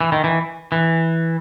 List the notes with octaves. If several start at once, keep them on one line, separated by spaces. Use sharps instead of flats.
E3
D#3
E3
E3